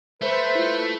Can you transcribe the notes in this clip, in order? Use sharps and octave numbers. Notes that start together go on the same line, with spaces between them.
A3 B4 C5
E4 F4